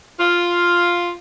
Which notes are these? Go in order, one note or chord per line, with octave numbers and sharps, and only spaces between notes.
F4